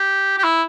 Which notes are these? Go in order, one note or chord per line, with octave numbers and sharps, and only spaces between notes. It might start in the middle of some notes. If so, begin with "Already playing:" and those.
Already playing: G4
G4
E4